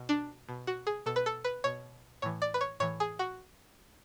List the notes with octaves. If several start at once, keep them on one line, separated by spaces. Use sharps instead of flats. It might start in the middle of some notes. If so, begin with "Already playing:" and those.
Already playing: B2
D4
B2
F#4
G#4
B2 A4
B4
A4
B4
B2 C#5
A2 E3 C#5
D5
B4
C#5
A2 E3 C#5
G#4
F#4